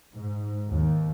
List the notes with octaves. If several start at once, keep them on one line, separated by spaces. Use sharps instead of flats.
G#2
D#2